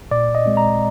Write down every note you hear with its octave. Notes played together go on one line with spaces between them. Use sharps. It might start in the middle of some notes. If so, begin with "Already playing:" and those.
A#2 D5
D#5
G#3 C4
A#5